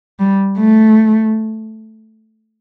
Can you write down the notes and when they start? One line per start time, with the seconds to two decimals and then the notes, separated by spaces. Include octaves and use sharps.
0.20 G3
0.58 A3